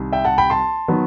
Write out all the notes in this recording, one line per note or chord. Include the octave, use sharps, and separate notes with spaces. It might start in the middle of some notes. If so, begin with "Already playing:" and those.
Already playing: C2 C3 D#3
E5 G5
F#5 A5
G5 B5
A5 C6
D#3 F#3 B3